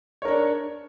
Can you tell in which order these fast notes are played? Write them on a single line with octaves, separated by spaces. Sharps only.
C#5 A#4 D4